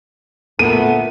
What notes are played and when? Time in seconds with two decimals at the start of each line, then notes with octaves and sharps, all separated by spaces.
0.59 A#2 D3 A3 B3 A4 A#4 D#7